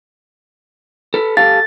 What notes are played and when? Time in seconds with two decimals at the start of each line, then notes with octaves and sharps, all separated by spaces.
1.14 A4 B4
1.37 G4 A4 F5 A6